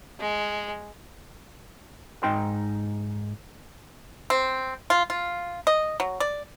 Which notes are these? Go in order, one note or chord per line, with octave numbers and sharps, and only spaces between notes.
G#3
G#2 D#4 G5 C6
C4
F4
F4
D#5
F#3
D5